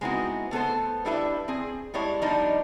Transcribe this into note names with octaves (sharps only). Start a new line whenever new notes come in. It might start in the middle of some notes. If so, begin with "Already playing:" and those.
G#3 B3 C4 D#4 E4 F#4
A3 B3 A4 C5
G3 D4 E4 G4 B4 E5
C4 G#4
G3 G#3 E4 C#5 A5
F3 G3 B3 D4 D#4